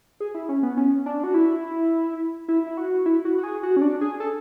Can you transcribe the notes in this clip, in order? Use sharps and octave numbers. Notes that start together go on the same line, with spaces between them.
G#4
E4
C#4
B3
C#4
D4
F#4
E4
E4
E4
F#4
E4
F#4
F#4
G#4
F#4
C#4
D4
G#4
A4